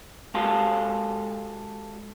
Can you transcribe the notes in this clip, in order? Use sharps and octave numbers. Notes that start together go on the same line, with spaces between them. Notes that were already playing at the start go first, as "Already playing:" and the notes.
G#3 F#4 G4 A4 F5 C6